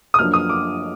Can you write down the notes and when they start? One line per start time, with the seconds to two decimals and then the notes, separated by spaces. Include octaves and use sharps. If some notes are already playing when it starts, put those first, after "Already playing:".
0.14 D#6
0.19 F#2 F3 A#3 D4 F6
0.34 D#6
0.49 D6